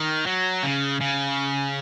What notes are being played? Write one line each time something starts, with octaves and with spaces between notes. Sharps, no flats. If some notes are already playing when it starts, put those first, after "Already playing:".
Already playing: D#3
F#3
C#3
C#3